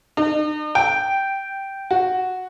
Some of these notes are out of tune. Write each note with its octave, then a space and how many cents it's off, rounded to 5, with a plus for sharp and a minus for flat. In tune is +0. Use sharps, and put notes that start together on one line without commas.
D#4 -45
G5 -5
F#4 -5